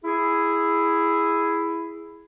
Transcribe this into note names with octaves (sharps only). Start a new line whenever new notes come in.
E4 G#4